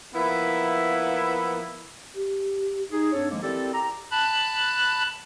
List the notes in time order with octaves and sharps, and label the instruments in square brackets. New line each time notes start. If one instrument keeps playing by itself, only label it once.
[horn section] F3 A#3 B3 E4
[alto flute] G4
[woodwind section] D#4 G#4
G2 C4 D4 A4 C#5
D#3 F3 G#3 A#3
C4 E4 G4 A4 A#4 D5
G4 A#5
[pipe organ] A5 B5 F#6